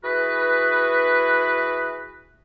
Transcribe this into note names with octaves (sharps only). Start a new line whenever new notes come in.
E3 F#4 G#4 B4